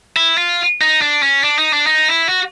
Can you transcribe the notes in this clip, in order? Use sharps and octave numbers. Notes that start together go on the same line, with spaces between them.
E4
F4
D#4
D4
C#4
D4
D#4
D4
D#4
E4
F#4